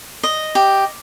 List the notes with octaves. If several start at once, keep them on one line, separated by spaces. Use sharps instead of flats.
D#5
G4